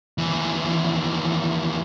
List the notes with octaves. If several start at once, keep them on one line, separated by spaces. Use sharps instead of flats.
D#2 E3